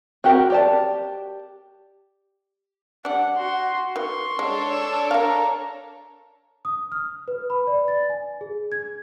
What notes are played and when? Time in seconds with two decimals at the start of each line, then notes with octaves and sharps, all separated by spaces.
0.24 C4 F#4 G4 A#4
0.50 G4 D5 A5
3.05 G3 D4 F#5
3.36 F#4 C6
3.96 D#3 B4 C6 C#6
4.39 G#3 D4 A4 C#5
4.69 E6
5.11 A#4 F5 A#5
6.65 D#6
6.92 F6
7.28 B4
7.50 B5
7.67 D5
7.88 A6
8.10 G#5
8.41 G#4
8.72 G#6